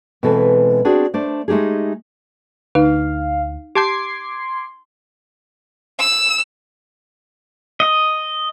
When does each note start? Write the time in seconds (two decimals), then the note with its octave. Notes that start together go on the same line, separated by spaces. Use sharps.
0.23 B2 E3 G#3 C4 A4 B4
0.84 B3 C4 D4 F#4 G#4
1.14 A3 D4 C5 D5
1.48 G#3 A3 D#4 G4 G#4
2.75 D2 D#4 B4 F5
3.75 G4 A5 C6 D6 G6 G#6 C7
6.00 E6
7.80 D#5